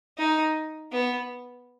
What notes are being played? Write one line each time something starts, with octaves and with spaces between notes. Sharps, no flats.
D#4
B3